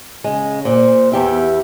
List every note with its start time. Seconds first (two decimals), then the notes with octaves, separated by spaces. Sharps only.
0.24 C#3 G#3
0.65 A#2 C5
1.12 E2 B3 G4 E5